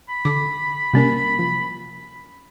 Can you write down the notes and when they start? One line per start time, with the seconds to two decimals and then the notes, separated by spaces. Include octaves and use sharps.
0.09 B5
0.25 D3 A4 D6
0.94 C3 G3 A#3 C#4 D4 A#4
1.39 F3